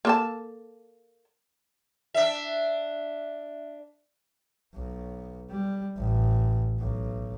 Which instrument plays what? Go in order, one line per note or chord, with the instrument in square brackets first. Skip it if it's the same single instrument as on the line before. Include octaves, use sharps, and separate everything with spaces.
[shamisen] A#3 A4 A5
[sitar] D4 E5
[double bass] B1
G3
A1
B1